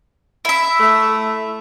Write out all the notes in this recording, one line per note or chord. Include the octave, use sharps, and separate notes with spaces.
E4 E5
A3